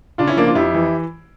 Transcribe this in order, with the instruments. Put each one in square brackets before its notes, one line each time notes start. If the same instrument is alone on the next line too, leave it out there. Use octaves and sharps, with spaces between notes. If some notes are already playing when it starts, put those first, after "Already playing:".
[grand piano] C#3 D4 F4
C#4 E4
F3 A#3 D4
D4 F4
F2 E4 G4
E3